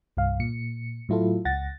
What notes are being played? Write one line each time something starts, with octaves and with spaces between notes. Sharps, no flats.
C2 G2 F5
A#2 C#7
A2 F#3 E4 F4 A4
C#2 F#5 A6 A#6